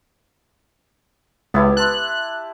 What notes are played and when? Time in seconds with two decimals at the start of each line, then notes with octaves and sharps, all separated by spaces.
1.54 C#2 B3 E4 G4
1.77 A5 C6 F#6